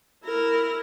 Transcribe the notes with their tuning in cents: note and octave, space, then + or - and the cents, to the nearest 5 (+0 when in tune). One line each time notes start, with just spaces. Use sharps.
E4 +0 A#4 -10